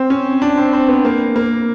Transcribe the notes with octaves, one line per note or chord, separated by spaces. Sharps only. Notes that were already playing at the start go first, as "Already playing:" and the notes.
Already playing: C4
C#4
D4
C4
C4
B3
A#3
A#3